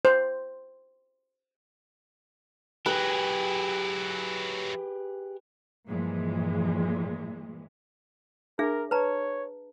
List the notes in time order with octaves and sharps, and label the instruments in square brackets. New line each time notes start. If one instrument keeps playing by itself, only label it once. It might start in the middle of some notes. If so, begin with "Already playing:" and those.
[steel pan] C5
[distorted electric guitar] F#3 E4 [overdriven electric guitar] G4 G#4 [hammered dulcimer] B4
[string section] G2 A#2 E3 F3 G#3
[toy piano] D4 G#4 E5 [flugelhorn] A#4
[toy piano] B4 A5 A#5 [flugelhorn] C#5